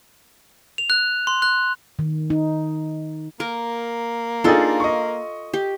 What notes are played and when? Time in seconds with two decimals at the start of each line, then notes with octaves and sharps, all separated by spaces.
0.78 F7
0.90 F#6
1.27 C6
1.42 F#6
1.99 D#3
2.30 D#4
3.40 A#3 A#4
4.44 D4 D#4 F4 G#4 A4
4.80 D#5 C#6
5.53 G4